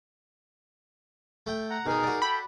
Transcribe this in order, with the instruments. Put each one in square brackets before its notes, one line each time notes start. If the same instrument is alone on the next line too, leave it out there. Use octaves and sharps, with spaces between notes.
[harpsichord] A3 G5
[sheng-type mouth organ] F#5 A#5
[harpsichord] B2 D#3 [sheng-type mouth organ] D#4 G#4 A#4
[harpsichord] F#4 D5
[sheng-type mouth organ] A4 G5 [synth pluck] B5